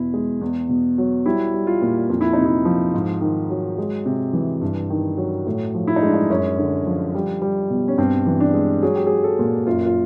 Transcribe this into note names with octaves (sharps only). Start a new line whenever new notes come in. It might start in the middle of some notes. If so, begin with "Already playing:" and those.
Already playing: E2 B2 E4
G#3
E2
B2
F#3
G3 E4
G3
F4
A#2
F2 F4
E4
C3 D#4
E4
F3
G#2
D#3
F#3
G#3
C3
E3
G2
D#3
F#3
A2
F3
E4
D#4
G#3 D4
D#4
F#2 C#4
D3
F3
G3
G3
B2
C#4
G2 C4
E3
D4
G#3
F#3 G#4
G4
G#4
F#3
A4
A#2
F#2 F4
F4